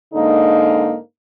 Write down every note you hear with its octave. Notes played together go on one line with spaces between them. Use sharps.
G#2 D3 A#3 D#4